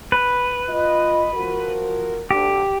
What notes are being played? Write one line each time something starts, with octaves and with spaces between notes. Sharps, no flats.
B4
F4 D#5
F3 F#4 A#4
D2 D3 G4